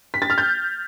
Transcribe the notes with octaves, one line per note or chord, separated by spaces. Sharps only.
B6
A6
F6
G6